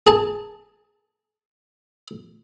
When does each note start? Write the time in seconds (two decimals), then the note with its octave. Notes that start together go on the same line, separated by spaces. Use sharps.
0.07 G#4 A5